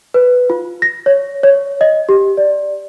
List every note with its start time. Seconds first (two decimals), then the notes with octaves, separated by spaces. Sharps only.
0.14 B4
0.50 F4
0.82 A#6
1.06 C#5
1.43 C#5
1.81 D#5
2.09 G4
2.37 D5